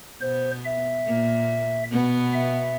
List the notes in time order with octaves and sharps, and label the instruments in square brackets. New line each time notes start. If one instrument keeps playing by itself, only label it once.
[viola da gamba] B2 B3 [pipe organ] C5
[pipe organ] E5
[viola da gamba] A#2 A#3
B2 B3
[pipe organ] E5